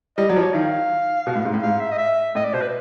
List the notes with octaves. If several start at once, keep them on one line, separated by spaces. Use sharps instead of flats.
G3 D#5
F#3 D5
F3
C#5
D#3 F5
B2
A2
G#2
A2
G#2 F5
E5
D#5
E5
A2 D#5
D5
B2 C5
B4